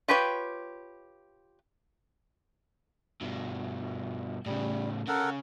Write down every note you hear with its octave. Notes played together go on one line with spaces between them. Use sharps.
F4 G4 B4 C#5 G5
G2 B2
A2 C#3 G3
C#3 A4 A#4 F#5